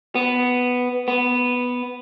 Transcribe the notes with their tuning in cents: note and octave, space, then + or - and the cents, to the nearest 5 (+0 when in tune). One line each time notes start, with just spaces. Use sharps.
B3 +5
B3 +0